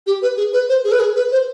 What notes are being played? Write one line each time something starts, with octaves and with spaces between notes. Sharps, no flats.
G4
B4
G#4
B4
C5
G#4
B4
G#4
B4
C5